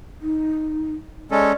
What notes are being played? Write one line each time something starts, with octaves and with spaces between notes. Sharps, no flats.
D#4
G#3 C#4 A4 D5